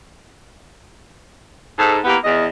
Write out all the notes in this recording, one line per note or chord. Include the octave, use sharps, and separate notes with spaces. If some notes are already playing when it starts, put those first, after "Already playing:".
G#2 A4
A#3 B3 E4 G4
E2 D#5